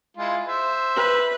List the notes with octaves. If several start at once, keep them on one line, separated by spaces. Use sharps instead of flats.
G#3 E4 F4
C5 E5
B4